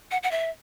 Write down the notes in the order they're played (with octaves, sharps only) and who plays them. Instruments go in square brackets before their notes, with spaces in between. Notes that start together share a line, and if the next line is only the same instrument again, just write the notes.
[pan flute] F#5
F#5
E5